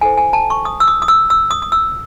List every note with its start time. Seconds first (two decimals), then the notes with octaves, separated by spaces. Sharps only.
0.01 E4 A4 C5 G#5
0.18 G#5
0.33 A5
0.50 C#6
0.65 D#6
0.80 E6
0.88 D#6
1.02 D#6
1.08 E6
1.30 E6
1.51 D#6
1.62 D#6
1.72 E6